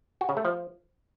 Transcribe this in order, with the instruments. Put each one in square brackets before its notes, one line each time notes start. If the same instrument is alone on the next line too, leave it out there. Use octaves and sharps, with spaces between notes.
[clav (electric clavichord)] F#4
C#3
A3
F3